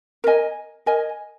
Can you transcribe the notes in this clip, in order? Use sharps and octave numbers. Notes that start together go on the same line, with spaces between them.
A#4 D#5 G#5
A#4 D#5 G#5